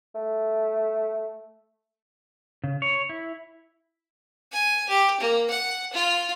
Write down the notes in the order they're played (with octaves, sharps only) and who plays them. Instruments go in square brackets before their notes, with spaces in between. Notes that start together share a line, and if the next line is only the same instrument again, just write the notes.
[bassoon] A3
[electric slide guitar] C#3
C#5
E4
[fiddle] G#5
G4
A#3
F#5
F4